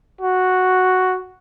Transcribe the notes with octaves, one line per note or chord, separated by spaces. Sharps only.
F#4